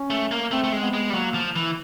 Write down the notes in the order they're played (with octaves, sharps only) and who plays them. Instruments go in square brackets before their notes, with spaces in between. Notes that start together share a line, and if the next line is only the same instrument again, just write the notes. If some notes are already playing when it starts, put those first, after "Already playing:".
Already playing: [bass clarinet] C#4
[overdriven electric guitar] A3
A#3
[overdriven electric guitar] A3 [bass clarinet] C4
[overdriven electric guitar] A3
G#3
[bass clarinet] B3
[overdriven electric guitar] G#3
G3
[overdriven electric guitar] F#3 [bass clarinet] A#3
[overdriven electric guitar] F3
E3